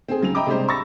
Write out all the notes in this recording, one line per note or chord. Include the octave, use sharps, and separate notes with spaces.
C4 G#4
C#3 F#3 F7
D#5 E5 G5 A#5 B5 D6
C3 G3 G#3 D4 G4 C5
B5 C#6 E6 A6 A#6